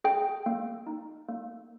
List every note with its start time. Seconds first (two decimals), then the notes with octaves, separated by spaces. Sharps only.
0.04 G#4 G5
0.46 A#3
0.87 D#4
1.29 A#3